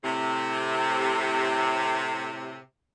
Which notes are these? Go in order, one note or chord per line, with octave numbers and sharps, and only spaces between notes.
A2 C3